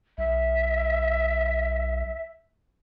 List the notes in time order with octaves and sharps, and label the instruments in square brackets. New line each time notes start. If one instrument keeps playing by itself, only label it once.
[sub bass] B1 [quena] E5